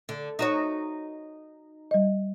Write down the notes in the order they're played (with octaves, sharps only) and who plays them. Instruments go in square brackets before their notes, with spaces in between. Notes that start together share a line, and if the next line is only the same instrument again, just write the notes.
[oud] D3
D#4 F#4 C#5
[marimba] G3 D#5